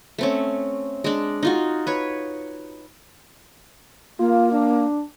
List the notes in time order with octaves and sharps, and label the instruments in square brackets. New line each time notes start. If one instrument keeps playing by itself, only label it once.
[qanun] A3 C4 C#4
G#3 D4
D#4 F4 F#4
B4 C#5
[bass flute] A#3 [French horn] F4
[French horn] D4